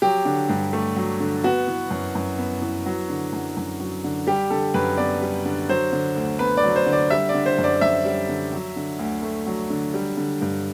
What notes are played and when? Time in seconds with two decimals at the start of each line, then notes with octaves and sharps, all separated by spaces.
0.02 F#3 G4
0.25 D3
0.49 G2
0.73 A3
0.96 F#3
1.20 D3
1.44 B3 F#4
1.67 E3
1.90 F#2
2.15 F#2
2.38 B3
2.62 E3
2.86 F#3
3.09 D3
3.33 F#2
3.57 F#2
3.80 F#3
4.04 D3
4.27 G3 G4
4.50 D3 A4
4.74 F#2 B4
4.97 B3 D5
5.22 G3
5.45 D3
5.69 F#3 C5
5.92 D3
6.16 D2
6.39 B3 B4
6.57 D5
6.63 F#3
6.76 C5
6.86 D3
6.93 D5
7.10 G3 E5
7.29 D5
7.34 D3
7.46 C5
7.58 F#2
7.64 D5
7.81 F#2 E5
8.05 G3
8.28 D3
8.52 F#3
8.76 D3
8.99 D2
9.23 A3
9.46 F#3
9.70 D3
9.94 G3
10.17 D3
10.41 G2